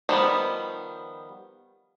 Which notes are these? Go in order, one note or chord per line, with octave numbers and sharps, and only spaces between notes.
D#3 F3 G3 B3